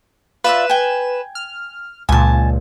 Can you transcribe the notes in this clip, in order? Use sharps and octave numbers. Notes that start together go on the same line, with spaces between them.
F4 B4 D5 E5 E7
G5 G#5
F6
C#2 A#2 G#5 A5